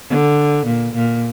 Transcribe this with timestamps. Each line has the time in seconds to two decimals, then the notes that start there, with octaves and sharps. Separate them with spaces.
0.10 D3
0.66 A#2
0.95 A#2